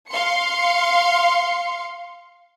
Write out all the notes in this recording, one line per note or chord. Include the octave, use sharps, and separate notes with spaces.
F5 C6 C#7